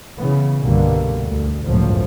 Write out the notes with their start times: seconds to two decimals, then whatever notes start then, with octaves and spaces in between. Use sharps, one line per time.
0.20 C#3 E3 B3
0.61 C2 G2 B2 D3 A#3
1.25 D2
1.64 G1 C#2 F#2 A2 F3